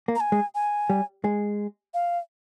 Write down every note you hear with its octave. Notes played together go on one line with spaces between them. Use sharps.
A#3
A#5
G#5
G#3
G#5
G3
G#3
F5